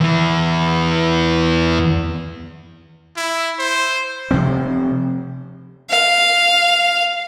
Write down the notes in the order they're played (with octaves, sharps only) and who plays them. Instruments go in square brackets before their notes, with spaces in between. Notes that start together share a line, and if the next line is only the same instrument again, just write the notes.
[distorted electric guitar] E2 E3
[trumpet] E4
C5
[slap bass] C3 F3 C4
[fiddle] F5